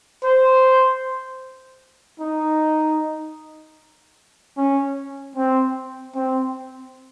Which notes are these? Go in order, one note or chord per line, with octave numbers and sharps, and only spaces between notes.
C5
D#4
C#4
C4
C4